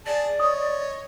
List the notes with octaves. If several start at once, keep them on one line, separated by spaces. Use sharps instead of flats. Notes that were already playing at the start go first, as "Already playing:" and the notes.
G#4 D5 A5
C#5 D#5 D#6